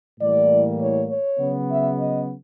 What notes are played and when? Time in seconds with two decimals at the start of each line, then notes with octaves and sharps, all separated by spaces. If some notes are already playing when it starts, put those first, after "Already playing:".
0.20 A2 E3 G3 A#3 D5
0.80 C#5
1.10 C#5
1.39 C#3 F#3 B3
1.70 E5
2.00 D#5